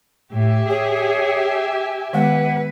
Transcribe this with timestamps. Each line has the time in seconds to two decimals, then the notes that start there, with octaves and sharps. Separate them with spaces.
0.32 A2 G4 E5 G#5
0.69 G#4 C#5
2.13 D#3 G#3 B3 B4 F#5